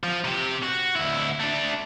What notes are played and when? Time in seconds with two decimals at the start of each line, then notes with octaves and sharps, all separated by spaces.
0.03 F3
0.24 C3 G4
0.63 F#4
0.96 D2 E4
1.40 A3 D4